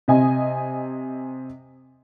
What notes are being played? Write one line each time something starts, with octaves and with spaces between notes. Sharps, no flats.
C3 D#5 G#5